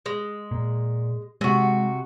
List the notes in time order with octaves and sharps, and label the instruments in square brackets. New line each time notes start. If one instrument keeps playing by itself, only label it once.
[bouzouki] G#3
[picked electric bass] A#2
[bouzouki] C3 F#4 [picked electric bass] G#3